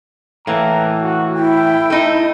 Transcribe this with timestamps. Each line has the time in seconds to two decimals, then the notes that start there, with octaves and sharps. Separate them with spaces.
0.47 A2 E3 A#3 A#5
1.02 F#4
1.37 E4 G5
1.90 A3 D#4